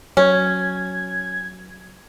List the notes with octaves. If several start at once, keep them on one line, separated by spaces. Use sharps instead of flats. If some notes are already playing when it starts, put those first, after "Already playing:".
F#3 C#4 C#5 G#6